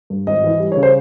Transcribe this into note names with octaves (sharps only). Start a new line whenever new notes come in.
G2
G#1 D#5
E3
G3
C#3 C#5
C5